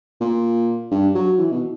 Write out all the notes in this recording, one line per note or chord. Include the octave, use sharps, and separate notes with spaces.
A#2
G2
F#3
E3
B2